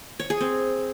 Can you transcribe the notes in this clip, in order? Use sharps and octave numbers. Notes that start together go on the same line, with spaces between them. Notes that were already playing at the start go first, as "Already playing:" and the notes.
C#5
G#4
C4